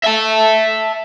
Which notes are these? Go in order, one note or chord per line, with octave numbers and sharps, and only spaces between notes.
E5 A5